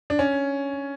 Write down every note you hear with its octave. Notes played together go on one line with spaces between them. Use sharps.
D4
C#4